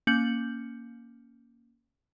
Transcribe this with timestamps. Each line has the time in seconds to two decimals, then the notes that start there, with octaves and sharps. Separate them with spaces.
0.07 A#3 C#4 G6 C#7 F#7